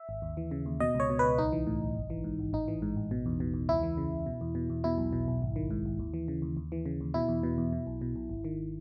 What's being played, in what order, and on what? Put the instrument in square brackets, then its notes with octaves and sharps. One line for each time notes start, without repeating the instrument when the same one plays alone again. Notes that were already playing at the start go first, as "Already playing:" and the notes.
Already playing: [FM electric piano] E5
G#1
D#2
E3
C#3
D#2
B2 D#5
C#2 C#5
B2
C#2 B4
B1 D#4
E3
A2
B1
G#1
E3
G#2
G#1
A1 D#4
E3
G#2
A1
B2
E2
B2
E2
C#2 E4
E3
C#3
C#2
B2
E2
B2
E2
B2 E4
B1
B2
B1
G#1
D#3
G#2
G#1
D#2
E3
C#3
D#2
D#2
E3
C#3
D#2
B2 E4
E2
B2
E2
B2
B1
B2
B1
G#1
D#3